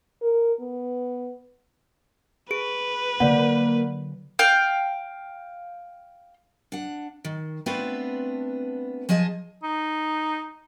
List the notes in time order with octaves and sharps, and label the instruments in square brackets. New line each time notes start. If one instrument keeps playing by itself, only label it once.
[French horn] A#4
B3
[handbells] G#4 D7 [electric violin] B4
[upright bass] D3 F#3 [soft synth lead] A#3 [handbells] D5 F#5
[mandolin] F5 G5
[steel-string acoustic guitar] D4 F#5
D#3
A3 B3 C4 D4 F4 B4
F3 G#4 D#5 A5
[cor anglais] D#4